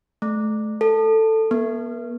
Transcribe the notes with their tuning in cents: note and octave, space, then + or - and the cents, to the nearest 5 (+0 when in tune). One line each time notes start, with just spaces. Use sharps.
A3 -30
A4 +10
B3 -45